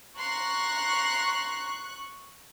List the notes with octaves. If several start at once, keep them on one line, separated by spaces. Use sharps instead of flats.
A#5 C6 C#6 F#6